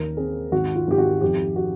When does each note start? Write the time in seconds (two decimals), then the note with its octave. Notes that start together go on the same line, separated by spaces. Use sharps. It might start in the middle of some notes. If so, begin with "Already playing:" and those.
Already playing: D#2 A#4
0.17 C4 G#4
0.52 G#1 F#4
0.75 F4
0.88 G#1 G4
0.98 F#4
1.21 F2 G4
1.56 F#4